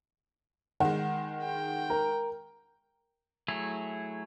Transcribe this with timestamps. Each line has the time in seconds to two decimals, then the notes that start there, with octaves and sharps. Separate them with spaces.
0.80 D#3 G#3 F#5
1.42 G5
1.90 A#4
3.48 F#3 A3 E4 G#4